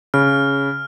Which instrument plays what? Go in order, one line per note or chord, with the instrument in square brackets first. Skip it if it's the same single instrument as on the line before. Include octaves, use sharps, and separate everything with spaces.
[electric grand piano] C#3 [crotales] F6